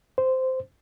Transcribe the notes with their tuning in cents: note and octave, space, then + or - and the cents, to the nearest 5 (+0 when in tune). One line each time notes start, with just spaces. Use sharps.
C5 -10